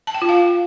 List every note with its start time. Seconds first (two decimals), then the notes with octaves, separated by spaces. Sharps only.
0.07 A5
0.14 G5
0.22 F4
0.29 F5